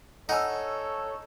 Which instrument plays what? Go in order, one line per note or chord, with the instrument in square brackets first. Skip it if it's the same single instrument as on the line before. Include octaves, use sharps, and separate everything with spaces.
[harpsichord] D#4 [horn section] A4 C#5 [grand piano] F#5 G#5 E6